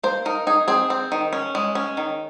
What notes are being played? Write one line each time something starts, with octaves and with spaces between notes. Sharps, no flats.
A#3 C5
D#4 A#4
D#4 G#4
C4 G#4
C4
D#3
C#4
G#3
C#4
D#3